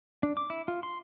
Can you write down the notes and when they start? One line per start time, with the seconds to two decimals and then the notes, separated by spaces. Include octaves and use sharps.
0.23 D4
0.37 D6
0.50 E4
0.68 F4
0.83 C6